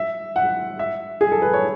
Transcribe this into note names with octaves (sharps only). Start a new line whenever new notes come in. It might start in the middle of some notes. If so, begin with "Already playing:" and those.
Already playing: E5
F#5
E5
G#4
A4
B4
C#5